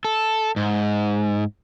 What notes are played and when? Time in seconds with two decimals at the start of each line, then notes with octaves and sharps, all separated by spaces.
0.05 A4
0.56 G#2